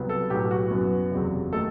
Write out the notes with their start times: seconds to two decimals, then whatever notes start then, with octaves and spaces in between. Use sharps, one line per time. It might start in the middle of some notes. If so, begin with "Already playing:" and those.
Already playing: C2 C3 F#3 B3
0.09 A4
0.30 B1 A2 F#3 B3 G4
0.51 F#4
0.71 F#2 F#3 B3
1.12 F#1 E2 C3 F#3
1.53 D#3 A3 A4